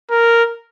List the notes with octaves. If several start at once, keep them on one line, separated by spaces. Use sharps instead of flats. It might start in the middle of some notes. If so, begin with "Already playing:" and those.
A#4